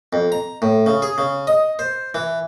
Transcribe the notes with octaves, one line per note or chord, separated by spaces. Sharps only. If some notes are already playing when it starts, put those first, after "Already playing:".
F2
A#5
A2
C#3
G#4
C#3
D#5
C5
E3